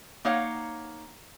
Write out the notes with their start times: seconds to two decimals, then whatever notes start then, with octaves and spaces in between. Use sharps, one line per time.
0.25 A#3 D#4 C#5 F5 F#5